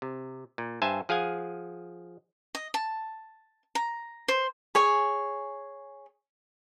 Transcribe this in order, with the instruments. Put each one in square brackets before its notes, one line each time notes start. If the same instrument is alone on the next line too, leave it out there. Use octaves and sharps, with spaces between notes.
[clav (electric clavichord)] C3
A#2
G2 C5 E5 G#5 A5
F3 G#4 F5 F#5 G#5
[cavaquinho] D#5
A5
A#5
C5
G#4 C#5 G#5